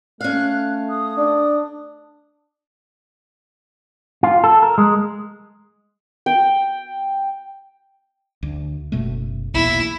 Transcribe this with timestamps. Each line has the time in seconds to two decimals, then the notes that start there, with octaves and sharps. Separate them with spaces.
0.21 A3 C#4 F5 F#6
0.89 D#6
1.17 D4
4.23 F4
4.44 A4
4.63 A#4
4.78 G#3
6.26 G5
8.43 D2
8.92 F#1 B2 A3
9.54 B1 E2 A#2 E4